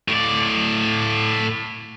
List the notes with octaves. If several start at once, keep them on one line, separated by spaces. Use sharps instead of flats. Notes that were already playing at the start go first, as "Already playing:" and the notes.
A2 D5